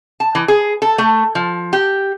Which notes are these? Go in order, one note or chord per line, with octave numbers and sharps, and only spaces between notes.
A5
E3
G#4
A4
A3
F3
G4